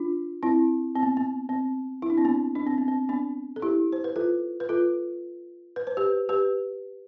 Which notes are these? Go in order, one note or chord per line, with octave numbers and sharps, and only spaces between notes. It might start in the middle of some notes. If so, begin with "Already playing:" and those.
Already playing: D4 F4
C4 E4
C4
B3
B3
C4
E4
D4
C4
B3 D4
D4
C4
B3
C4
B3 D4
A4
E4 G4
C5
B4
F4 A4
B4
F4 A4
B4
C5
G4 B4
G4 B4